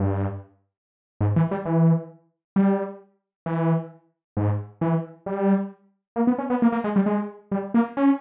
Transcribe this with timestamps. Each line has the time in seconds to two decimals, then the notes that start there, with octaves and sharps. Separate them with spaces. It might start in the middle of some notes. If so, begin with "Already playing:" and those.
Already playing: G2
1.21 G#2
1.36 E3
1.51 G3
1.65 E3
2.56 G3
3.46 E3
4.37 G#2
4.81 E3
5.26 G3
6.16 A#3
6.27 B3
6.38 C#4
6.50 B3
6.62 A#3
6.72 A#3
6.84 G#3
6.96 G3
7.06 G#3
7.51 G3
7.74 A#3
7.97 C#4